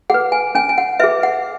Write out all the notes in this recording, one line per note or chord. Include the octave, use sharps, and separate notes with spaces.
G#4 B4 F#5
G#5
C#4 G#5
G#5
F#5
G#4 B4 E5
F#5